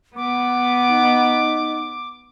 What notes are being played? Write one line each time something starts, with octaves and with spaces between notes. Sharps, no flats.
B3 D6
D#4